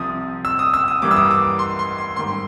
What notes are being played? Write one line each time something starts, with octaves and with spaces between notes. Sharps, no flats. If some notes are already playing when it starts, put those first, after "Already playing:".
Already playing: C2 C3 F3 D#6
E6
D#6
E6
D#6
G2 E3 G3 A#3 D6
E6
D#6
D6
C6
C6
C6
G#2 D#3 G3 C6